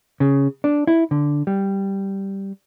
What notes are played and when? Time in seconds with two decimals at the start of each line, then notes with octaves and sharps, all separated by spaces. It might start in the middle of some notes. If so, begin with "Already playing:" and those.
0.20 C#3
0.64 D4
0.87 E4
1.11 D3
1.47 G3